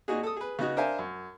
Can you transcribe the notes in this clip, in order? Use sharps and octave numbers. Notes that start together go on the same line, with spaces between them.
A#2 D#4 F#4 G#4
A4 D#6
G#4 B4
C#3 B3 D#4 F#4 F#6
D4 A#4 C5 E5 F5 G#5
F#2